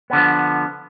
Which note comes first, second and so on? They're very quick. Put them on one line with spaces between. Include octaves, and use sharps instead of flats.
B3 D3 F3